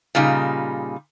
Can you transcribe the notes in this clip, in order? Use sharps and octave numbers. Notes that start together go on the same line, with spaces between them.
A#2 C#3 G3 D#4